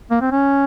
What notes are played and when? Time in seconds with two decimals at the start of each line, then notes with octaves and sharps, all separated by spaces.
0.11 A#3
0.21 C4
0.31 C#4